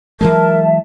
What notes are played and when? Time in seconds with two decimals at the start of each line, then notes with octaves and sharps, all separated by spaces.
0.21 E3 F#3 G#3 A#4 E5 A5